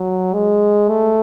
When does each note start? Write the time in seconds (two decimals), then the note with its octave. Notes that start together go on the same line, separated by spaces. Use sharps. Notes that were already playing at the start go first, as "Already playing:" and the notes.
Already playing: F#3
0.34 G#3
0.89 A3